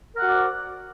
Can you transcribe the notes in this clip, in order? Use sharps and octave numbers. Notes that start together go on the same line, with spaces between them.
F#4 A#4 C5 D5 F#5